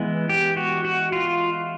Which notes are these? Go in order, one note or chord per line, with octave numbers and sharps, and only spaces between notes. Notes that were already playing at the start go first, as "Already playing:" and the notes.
Already playing: E3 G#3 B3
G4
F#4
F#4
F4